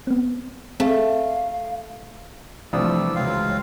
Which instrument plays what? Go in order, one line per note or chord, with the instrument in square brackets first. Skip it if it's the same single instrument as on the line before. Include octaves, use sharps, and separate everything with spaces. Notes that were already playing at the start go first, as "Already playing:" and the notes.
[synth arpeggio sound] B3 C4
[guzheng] A3 [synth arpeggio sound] C4 G#4 [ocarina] F5
[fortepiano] C2 D4 D#6 [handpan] E3 [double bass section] F3 A3 [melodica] G3 E6
[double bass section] C#2 F#3 [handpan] G#3 [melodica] C4 F4 F5